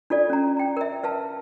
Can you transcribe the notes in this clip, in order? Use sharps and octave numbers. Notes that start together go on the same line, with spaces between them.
D4 F4 A4 D5
C#4 A#5
G5 A#5
A#4 E5
B4 F5 A5